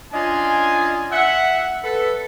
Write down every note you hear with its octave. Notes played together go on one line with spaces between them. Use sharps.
C#4 D4 F4 D#5 G#5
E5 F#5
A4 B4